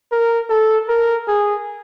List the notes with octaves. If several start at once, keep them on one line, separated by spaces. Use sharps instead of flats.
A#4
A4
A#4
G#4